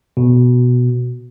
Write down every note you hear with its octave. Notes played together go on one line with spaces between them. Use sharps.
B2